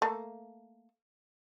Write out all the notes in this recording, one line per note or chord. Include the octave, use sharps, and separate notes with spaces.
A3 A#3